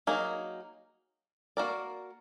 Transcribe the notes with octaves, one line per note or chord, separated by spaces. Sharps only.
F#3 A#3 D#4 G#4
A#3 D4 F#4 A#4 D5